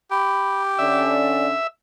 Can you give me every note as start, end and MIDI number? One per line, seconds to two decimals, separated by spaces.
0.11 1.16 67
0.11 0.62 83
0.79 1.53 50
0.79 1.53 61
0.79 1.46 74
0.79 1.67 76